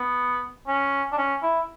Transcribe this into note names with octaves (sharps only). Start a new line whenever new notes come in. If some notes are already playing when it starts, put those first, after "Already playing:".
Already playing: B3
C#4
D4
C#4
E4